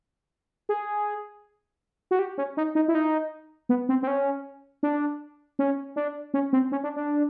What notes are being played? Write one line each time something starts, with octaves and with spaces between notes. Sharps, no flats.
G#4
F#4
G4
C#4
D#4
D#4
E4
D#4
B3
C4
C4
C#4
D4
C#4
D4
C#4
C4
C#4
D4
D4